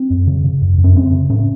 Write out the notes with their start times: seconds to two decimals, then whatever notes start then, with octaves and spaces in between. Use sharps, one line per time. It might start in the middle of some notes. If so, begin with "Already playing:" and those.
Already playing: C4
0.10 F#2
0.27 C#3
0.44 C#3
0.61 F#2
0.78 F#2
0.84 C#4
0.95 C#3 C4
1.12 C#3
1.30 A2 C#4